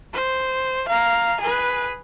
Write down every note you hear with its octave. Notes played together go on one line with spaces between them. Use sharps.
C5
F5 A#5
G#4 B4